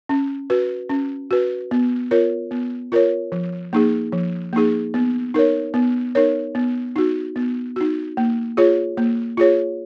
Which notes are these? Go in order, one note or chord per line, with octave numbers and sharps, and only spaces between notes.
C#4
F#4 B4
C#4
F#4 B4
B3
F4 A#4 C#5
B3
F4 A#4 C#5
F3
A#3 D#4 G#4
F3
A#3 D#4 G#4
B3
D#4 A#4 C#5
B3
D#4 A#4 C#5
B3
D#4 F#4
B3
D#4 F#4
A#3
F4 G#4 C#5
A#3
F4 G#4 C#5